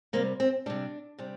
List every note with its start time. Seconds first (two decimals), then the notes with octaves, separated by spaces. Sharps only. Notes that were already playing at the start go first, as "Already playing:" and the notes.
0.13 C3 G3 A#3
0.40 C4
0.66 C3 G3 D4
1.19 C3 G3